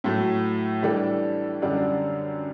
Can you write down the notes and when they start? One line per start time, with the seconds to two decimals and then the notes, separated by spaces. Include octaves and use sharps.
0.04 A2 F#3 A3
0.83 E3 G3 D4 A4
1.62 F#2 D3 G3 D4